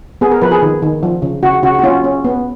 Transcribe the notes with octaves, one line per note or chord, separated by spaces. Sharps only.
B3 G#4
A#4
F3 B4
G#4
D#3
D#3
F3
C#3
C#3 F#4
C#3 F#4
F#4
C#4 F4
C#4
B3